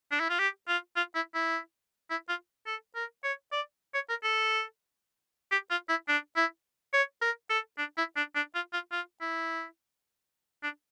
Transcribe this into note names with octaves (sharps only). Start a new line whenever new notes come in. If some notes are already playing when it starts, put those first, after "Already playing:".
D4
E4
F4
G4
F4
F4
E4
E4
E4
F4
A4
A#4
C#5
D5
C#5
A#4
A4
G4
F4
E4
D4
E4
C#5
A#4
A4
D4
E4
D4
D4
F4
F4
F4
E4
D4